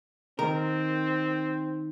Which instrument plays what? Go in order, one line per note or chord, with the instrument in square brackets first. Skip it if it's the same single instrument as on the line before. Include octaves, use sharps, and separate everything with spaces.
[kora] D#3 [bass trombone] C4 [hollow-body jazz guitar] A#4